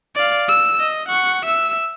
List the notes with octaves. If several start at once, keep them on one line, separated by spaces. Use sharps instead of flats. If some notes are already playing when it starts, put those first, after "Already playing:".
D5 F5
E6
D#5
F#5 C#6
E5 E6